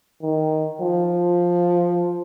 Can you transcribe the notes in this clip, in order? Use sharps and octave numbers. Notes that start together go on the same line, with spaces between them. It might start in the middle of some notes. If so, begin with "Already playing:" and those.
D#3
F3